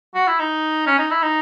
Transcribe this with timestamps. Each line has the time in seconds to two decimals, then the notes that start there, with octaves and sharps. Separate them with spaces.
0.15 F#4
0.27 E4
0.39 D#4
0.87 C#4
0.99 D#4
1.11 E4
1.22 D#4